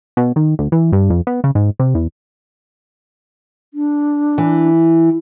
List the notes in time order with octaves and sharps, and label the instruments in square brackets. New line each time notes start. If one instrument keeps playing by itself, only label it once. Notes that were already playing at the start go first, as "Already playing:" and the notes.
[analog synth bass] B2
D#3
D2
E3
G2
F2
B3
C#3
G#2
C3
E2
[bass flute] D4
[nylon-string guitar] E3